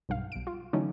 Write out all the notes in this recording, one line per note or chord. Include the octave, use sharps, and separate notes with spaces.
B1 G2 F5
B1 D7
F4
D3 E3 F#3 A3 C#4 D#4